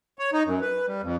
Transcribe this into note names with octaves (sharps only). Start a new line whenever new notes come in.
C#5
D#4
F#2
B4
G3
F2